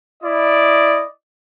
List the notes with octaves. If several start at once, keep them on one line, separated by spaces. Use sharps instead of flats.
E4 D5 D#5